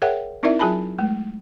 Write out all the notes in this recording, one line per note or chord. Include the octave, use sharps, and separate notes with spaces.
G#4 A#4 C#5 E5 F#5 G5
C4 D#4 E4 A#4 D5 E5
F#3 F4 G#4 G#5 A5 B5
G#3 A3